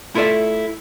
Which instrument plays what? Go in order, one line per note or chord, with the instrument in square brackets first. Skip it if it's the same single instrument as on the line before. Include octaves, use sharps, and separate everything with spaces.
[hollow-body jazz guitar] A3 E4 F4 A4 D5 E5